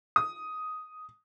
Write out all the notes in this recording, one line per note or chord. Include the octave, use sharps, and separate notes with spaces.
D#6